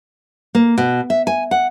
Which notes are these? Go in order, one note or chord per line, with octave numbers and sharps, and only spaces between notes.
A#3
B2
E5
G#5
F#5